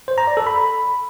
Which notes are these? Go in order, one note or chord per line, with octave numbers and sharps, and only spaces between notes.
C5
A#5
D5
A4
B5